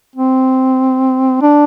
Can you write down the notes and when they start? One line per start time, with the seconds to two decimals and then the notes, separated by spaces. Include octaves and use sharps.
0.16 C4
1.42 D4